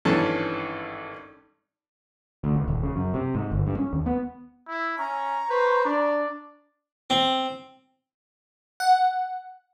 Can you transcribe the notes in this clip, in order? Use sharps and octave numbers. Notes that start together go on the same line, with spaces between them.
G#1 G2 E3 C#4 A4 A5
D2
C#2
D#1
C#3
F#2
C3
G#2
G1
G2
C#4
D#2
B3
E4
C#4 A#5 C#6
B4 C5
D4 D5
C4
F#5